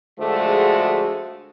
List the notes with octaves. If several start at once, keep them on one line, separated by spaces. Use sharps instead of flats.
D3 F3 G#3 A3 F#4 G#4